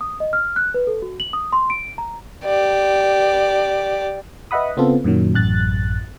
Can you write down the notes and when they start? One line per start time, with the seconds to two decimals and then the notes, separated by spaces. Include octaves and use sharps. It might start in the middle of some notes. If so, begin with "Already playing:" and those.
0.01 D#6
0.20 D#5
0.33 F6
0.56 F#6
0.74 B4
0.87 A4
1.02 F#4
1.20 F#7
1.33 D#6
1.53 C6
1.70 D7
1.98 A#5
2.45 G4 D5
4.51 B4 D#5 E5 F#5 B5 D#6
4.77 C#3 B3 C4 F4 A4
5.04 F#2 A#2 D#3 F#3
5.34 A1 F#2 F#6 A6